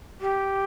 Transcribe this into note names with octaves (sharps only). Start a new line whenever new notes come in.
G4